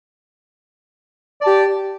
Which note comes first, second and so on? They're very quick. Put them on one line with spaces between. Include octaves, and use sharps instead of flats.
D5 A5 G4